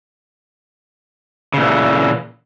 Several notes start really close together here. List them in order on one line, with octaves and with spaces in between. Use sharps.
C#3 A#2 E3